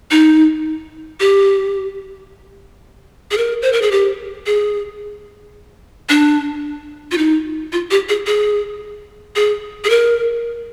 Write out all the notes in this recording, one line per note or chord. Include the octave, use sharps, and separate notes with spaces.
D#4
G4
G#4
A#4
C5
A#4
G#4
G4
G#4
D4
F4
D#4
F4
G4
G#4
G#4
G#4
G#4
A#4